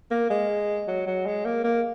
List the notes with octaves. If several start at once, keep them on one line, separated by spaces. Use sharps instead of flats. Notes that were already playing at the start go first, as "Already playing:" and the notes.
A#3
G#3
F#3
F#3
G#3
A#3
A#3